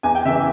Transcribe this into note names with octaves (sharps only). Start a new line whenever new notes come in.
E2 G#5
G5
C#3 E3 E5
E5